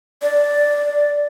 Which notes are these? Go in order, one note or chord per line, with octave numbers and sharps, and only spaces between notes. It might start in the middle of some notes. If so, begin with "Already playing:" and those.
D5